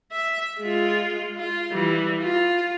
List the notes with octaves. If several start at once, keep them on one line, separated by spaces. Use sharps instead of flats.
E5
G#3 F4
F4
E3 G3
F4